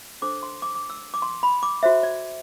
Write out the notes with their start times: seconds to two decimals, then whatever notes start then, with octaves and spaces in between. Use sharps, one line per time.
0.22 D4 A4 C5 D6
0.43 C6
0.62 D6
0.75 D6
0.90 E6
1.14 D6
1.22 C6
1.43 B5
1.63 D6
1.83 F#4 A4 C5 E5
2.03 D5